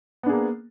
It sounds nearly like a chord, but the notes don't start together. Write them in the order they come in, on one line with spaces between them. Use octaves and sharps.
B3 D4 G#4 A#3